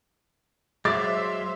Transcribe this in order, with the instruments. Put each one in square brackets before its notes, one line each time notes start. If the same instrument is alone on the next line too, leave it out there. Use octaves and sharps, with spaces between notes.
[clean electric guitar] F#3 G#3 [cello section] C5 E5 F5 [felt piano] D6 E6 A6